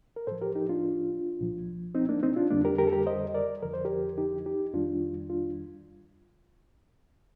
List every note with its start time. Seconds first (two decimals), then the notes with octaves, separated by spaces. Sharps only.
0.16 A#4
0.27 A2 F3 A4 C5
0.41 G4 A#4
0.55 D#4 G4
0.69 D4 F4
1.39 C2 A#2 F3
1.95 C4 D#4
2.09 A#3 D4
2.23 C4 D#4
2.36 D4 F4
2.51 F2 D3 G3 A#3 D4
2.65 G4 A#4
2.78 G4 A#4
2.87 A4
2.92 G4 A#4
3.06 C5 D#5
3.34 A#4 D5
3.63 F2 D3 F3 A#4
3.74 C5
3.85 G4 A#4
4.18 D#4 G4
4.46 D#4 G4
4.74 F2 D#3 G3 D4 F4
5.30 D4 F4